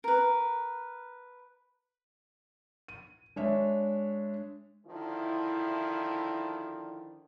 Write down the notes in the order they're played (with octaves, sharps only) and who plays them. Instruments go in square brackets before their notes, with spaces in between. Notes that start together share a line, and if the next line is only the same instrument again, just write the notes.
[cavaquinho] A#4 B4
[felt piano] D#7
G#3 D4 C#5 E5
[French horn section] D3 D#3 F3 E4